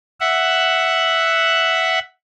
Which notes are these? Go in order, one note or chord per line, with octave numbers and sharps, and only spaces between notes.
E5 F#5